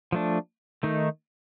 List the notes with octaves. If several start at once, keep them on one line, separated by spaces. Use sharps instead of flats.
F3 A3 D4
D#3 A3 D#4